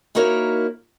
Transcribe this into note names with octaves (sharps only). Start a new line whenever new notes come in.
A#3 D#4 E4 F#4 A#4 C#5